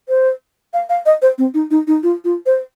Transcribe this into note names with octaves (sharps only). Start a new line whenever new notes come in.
C5
F5
F5
D#5
C5
C4
D#4
D#4
D#4
F4
F4
C5